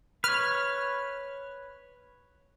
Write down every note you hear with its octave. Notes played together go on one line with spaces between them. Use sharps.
B4 C#5 F6